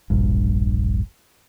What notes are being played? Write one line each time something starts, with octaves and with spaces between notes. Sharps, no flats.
E1 A#1 G2